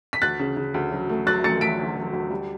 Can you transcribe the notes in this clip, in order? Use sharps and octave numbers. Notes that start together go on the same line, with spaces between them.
B6
D2 F#6 A6
C#3
C#3
D2
F#3
A3
F#3 F#6 A6
A3 A6 C#7
A3 B6 D7
D2
F#3
D2
G3